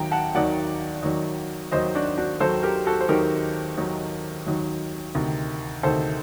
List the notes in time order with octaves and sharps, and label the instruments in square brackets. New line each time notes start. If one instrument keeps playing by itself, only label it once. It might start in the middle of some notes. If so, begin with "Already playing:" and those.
Already playing: [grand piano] D#2 D#3 F#3 G5 A#5
F#5 A5
D#2 D#3 F#3 D5 F#5
D#2 D#3 F#3
D#2 D#3 F#3 C5 D#5
D4 F#4
D4 F#4
D#2 D#3 F#3 A4 C5
G4 A#4
F#4 A4
C5
D#2 D#3 F#3 G4 A#4
D#2 D#3 F#3
D#2 D#3 F#3
D2 C3 D#3
D2 C3 D#3 A4 C5